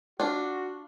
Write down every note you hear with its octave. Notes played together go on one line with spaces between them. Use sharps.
D4 F4 F#4